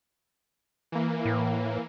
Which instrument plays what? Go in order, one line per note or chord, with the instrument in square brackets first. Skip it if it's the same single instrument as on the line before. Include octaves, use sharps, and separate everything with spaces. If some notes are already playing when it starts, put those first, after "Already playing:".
[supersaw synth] E3 A#3
[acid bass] A2